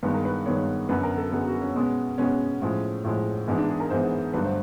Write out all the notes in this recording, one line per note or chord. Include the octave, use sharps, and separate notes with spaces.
G2 D#3 G#3 B3 B4
A#4
B4
G2 D#3 G#3 B3 C#5
F#2 D3 F#3 B3 B4
A#4
A4
F#2 D3 F#3 B3 G#4
F#4
C#4
B2 G#3 B3
B2 G#3 B3 C#4
A2 F3 G#3
A2 F3 G#3
G#2 E3 G#3 B3 D4
D4
G#4
A#4
G#2 E3 G#3 B3 C5
G2 D3 F#3 A3 B4
C5